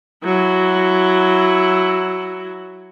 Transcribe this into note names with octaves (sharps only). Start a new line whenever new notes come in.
F#3 E4